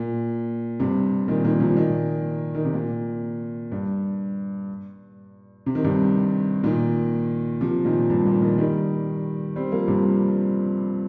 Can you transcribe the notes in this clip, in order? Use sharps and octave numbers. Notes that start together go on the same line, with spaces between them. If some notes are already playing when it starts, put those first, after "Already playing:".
Already playing: A#2
G2 C3
A#2 D#3
A#2 D#3
C3 F3
A#2 D#3
D#3
C3
A#2
G2
C3
D#3
G2 C3
A#2 D#3
C3 F3
A#2 D#3
G2
A#2
A#2 D#3
D#3 G3
G3 C4
F3 A#3
G2 C3